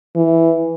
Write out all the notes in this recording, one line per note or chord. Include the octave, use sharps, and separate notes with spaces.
E3